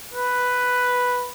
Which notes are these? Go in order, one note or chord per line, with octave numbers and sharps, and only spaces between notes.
B4